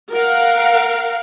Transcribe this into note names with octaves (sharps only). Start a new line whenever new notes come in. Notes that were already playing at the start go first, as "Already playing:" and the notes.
A#4 F5 F#5